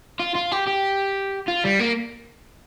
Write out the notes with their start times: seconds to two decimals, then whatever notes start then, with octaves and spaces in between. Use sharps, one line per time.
0.19 F4
0.35 F4
0.52 G4
0.68 G4
1.48 F4
1.64 G3
1.79 A#3